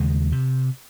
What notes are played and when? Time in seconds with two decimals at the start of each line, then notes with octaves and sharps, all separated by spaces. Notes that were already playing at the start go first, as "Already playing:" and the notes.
Already playing: D#2 C#3 G#3
0.32 C3